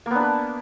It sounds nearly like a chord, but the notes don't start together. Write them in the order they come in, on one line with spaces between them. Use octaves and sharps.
A#3 B3 D4 B4